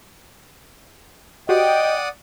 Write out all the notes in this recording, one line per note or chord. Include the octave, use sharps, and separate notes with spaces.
F#4 G4 C5 D5 D#5 F#5 G5 D#6